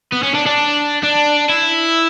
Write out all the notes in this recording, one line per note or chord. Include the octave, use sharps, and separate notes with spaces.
B3
C#4
D4
D4
D4
E4